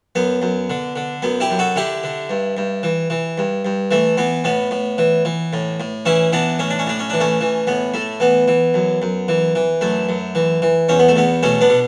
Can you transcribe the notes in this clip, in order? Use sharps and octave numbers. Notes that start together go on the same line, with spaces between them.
F#2 B3
F#2
D3
D3
F#2 B3
E4 G4
F#2
F#4 A4
D3 E4 G4
D3
G2
G2
E3
E3
G2
G2
E3 A3
E3 B3
A2 B3
A2
E3
E3
A2
A2
E3 C#4 E4
E3 B3 D4
A2 C#4
D4
C#4
A2 D4
C#4
E3 D4
A3 C#4
E3
A2 B3
A2 A3
E3 B3
E3
F#2
F#2
E3
E3
F#2 A3
F#2
E3
E3
E2 C#4
B3
A3
E2 B3
B2 A3 C#4
B3 D4
B2